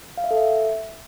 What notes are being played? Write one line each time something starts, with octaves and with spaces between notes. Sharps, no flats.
F5
E5
A4
E5